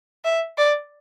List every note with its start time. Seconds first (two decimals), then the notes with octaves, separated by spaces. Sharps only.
0.25 E5
0.58 D5